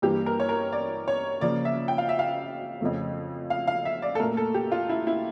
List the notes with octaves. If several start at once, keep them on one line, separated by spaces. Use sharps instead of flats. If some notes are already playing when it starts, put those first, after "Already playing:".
G2 E3 G3 A#3 G4
A#4
C#5
A#4
D5
C#5
C#3 F3 A#3 D5
E5
G5
F5
E5
F5
F2 C#3 F3 A3
F5
F5
E5
D5
A4
A#2 A3 A#4
A4
G4
F4
E4
E4